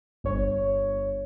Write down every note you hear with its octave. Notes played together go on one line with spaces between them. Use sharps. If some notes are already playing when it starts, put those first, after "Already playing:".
G1 C#5